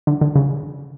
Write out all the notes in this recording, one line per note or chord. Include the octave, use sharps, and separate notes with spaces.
D3
D3
C#3